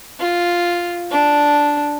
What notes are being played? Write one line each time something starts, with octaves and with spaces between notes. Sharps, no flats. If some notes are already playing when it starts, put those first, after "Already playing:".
F4
D4